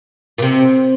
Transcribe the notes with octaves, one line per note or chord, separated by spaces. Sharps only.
A#2
C3